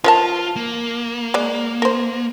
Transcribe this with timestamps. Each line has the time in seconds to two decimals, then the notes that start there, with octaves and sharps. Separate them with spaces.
0.04 F3 F4 A#4 A5
0.56 A#3
1.34 G#3 D5
1.82 A#4 C5